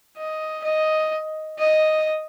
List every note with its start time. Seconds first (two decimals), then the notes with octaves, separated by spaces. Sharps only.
0.17 D#5
0.64 D#5
1.59 D#5